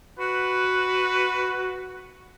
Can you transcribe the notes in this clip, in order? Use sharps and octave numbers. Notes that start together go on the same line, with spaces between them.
F#4 B4